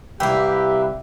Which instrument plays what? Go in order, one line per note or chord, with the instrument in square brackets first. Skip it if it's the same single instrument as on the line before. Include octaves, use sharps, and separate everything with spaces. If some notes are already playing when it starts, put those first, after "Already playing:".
[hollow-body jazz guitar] C2 C3 G5 [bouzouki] A#3 E4 [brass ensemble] G4 [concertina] B4 E5